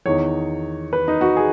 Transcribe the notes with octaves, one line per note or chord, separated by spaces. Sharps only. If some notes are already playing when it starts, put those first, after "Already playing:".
E2 D#3 C#5
B4
D#4
F#4
G#4